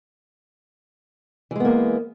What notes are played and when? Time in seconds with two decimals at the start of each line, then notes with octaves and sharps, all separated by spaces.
1.51 E3
1.56 G#3
1.60 B3
1.65 A#3